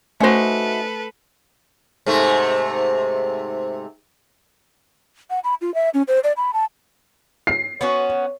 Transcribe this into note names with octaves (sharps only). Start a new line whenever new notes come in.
A3 C#4 D#4 F#4 A4 B4 C5 E5
G#2 C3 A3
F#5
B5
F4
E5
C#4
C5
D5
B5
A5
C7
B3 C#4 F#4 C#5